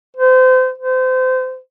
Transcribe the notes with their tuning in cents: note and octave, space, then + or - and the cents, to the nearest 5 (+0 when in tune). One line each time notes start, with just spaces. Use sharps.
C5 -30
C5 -30